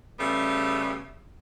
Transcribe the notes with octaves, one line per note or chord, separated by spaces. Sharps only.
C#3 G3 A3 B3